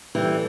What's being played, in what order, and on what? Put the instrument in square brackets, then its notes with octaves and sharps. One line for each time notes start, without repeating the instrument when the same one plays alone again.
[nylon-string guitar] E3 G3 [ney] A4